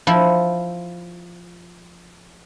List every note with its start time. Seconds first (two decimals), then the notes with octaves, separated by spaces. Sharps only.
0.07 F3 E4